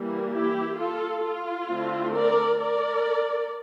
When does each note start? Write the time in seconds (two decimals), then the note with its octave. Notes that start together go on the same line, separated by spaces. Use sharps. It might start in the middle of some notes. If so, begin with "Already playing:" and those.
Already playing: E3 G3 A#3
0.32 E4 G4
0.78 F4 A4
1.23 F4
1.69 D3 A3 C4
2.14 A#4 D5
2.59 A#4 D5